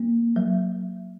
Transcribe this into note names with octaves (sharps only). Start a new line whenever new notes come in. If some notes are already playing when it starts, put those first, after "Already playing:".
Already playing: A#3
F#3